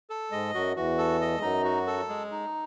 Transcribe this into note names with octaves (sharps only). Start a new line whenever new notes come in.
A4
G#2 G#3 D#5
F#2 F#3 F#4
E2 E3 F#4
A4
D#5
G#3
F#2 F#3 D#4
F#4
A4
G#3
D#4